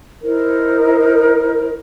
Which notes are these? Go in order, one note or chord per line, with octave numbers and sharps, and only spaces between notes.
D#4 E4 A#4 C5